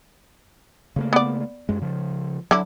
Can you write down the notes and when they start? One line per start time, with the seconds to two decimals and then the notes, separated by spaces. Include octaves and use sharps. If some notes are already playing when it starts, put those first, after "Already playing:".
0.96 C#3 A3 A#3
1.13 B3 D5
1.69 F#2 G#3
1.81 C#3 F3
2.51 D3 F#3 E4